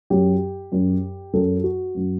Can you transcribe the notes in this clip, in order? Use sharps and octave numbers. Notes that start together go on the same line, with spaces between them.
F#2 F#3 G4
F#2 F#3
F#2 F#3 A4
F#4
F#2 F#3